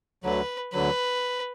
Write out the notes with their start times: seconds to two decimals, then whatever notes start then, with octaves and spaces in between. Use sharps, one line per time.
0.24 D2 D3 F#3 B4
0.73 D2 D3 F#3 B4